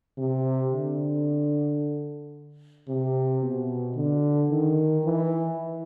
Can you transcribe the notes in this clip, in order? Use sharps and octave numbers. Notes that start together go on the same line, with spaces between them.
C3
D3
C3
B2
D3
D#3
E3